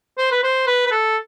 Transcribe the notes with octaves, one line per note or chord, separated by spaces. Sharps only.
C5
B4
C5
B4
B4
A4